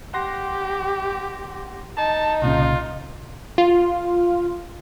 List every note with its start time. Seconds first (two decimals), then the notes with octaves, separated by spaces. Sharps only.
0.14 G4 F#5 C6 A#6
1.97 D#4 A5
2.42 C2 A#2 C#3 F4
3.58 F4